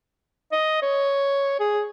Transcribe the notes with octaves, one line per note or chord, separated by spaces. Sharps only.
D#5
C#5
G#4